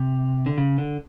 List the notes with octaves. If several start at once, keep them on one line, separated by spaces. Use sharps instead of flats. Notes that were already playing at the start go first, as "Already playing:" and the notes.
Already playing: C3
D3
C#3
D3